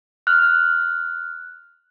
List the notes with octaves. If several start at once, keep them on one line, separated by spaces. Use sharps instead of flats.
F6 F#6